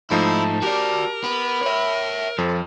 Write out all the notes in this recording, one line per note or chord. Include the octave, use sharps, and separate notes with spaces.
G#2 F3 A3 D#4 E4 A5
F#4 G4 A#4 D5
B3 B5
C#5 E5
F2 F3 A4